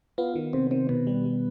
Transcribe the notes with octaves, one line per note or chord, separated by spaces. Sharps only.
B3 F4
D#3
C3 C4
D#3 C4
B2 B3
G3
G3